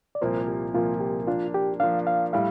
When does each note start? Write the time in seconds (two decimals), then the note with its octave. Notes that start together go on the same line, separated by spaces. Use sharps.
0.15 D5
0.21 C2 A#2 F3 A#3 C5
0.48 G4
0.74 C2 A#2 F3 A#3 F4
1.00 G4
1.27 F3 A#3 D4 F4
1.54 G4
1.80 F3 A#3 D4 F5
2.07 F5
2.33 A2 G3 F5